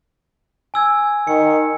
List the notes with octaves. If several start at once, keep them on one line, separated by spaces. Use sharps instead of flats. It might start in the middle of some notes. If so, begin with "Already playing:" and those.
G#5 E6 G#6
D#3 C#7